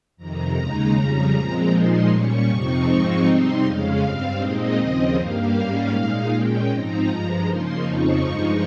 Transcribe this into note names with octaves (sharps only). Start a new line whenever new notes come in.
F2 C3 D#3 A#5
D#2 C#3 G#3 D#4
F2 C#3 G3 C#4
A#2 F3 G#3 C4
A#2 F3 G#3 D#4 C6
A#2 G3 C#4 C#6
F2 C3 F3 C4 D#4 C#6
G#2 F3 G#3 C4 D#4 C#6
C3 G3 C4 D#4 C6
F2 C#3 G#3 C#4 F5
G2 G3 C4
A#2 G#3 C4 D#4 D#5
D#2 C#3 F3 C4
G2 G3 A#3 F5
G#2 G3 A#3 C#4
A#2 G#3 D#4
A#2 G#3 C#4 G5
G#2 F3 C4 D#4 A#5
G2 F3 G#3
C#3 F3 A#3 D#4 C6
F2 C#3 F3 C4 D#4 C#6
G2 F3 G#3 D#4